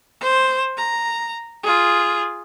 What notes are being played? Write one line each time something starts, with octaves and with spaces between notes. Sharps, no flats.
C5
A#5
F4 G#4